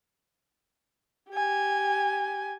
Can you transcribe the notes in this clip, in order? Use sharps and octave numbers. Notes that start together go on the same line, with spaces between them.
G4 G#5